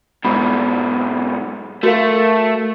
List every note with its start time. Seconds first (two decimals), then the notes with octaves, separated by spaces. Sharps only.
0.25 G#2 B2 B5
1.83 A3 F#4 A#4 F5